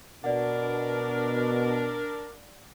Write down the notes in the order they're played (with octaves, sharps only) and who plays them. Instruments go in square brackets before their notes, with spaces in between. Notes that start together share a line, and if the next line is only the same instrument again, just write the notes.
[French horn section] B2 [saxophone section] D4 A#4 [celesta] D5 F#5